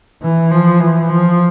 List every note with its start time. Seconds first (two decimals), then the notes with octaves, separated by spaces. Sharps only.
0.22 E3
0.51 F3
0.80 E3
1.09 F3